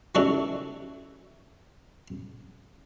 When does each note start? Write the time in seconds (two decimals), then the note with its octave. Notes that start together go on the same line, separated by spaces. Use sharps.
0.15 D#3 G3 C#4 E4 F#4 A4